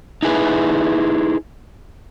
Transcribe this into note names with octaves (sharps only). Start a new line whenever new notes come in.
D#4 E4 G#4 B4